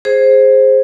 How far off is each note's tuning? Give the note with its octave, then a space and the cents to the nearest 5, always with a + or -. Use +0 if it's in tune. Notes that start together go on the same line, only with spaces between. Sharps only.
G#4 +0 C5 +10